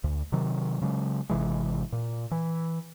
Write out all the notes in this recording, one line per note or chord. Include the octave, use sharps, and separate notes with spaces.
D2
C3 D#3 F#3
C#3 F#3 G#3
G#1 C3 E3 G#3
A#2
E3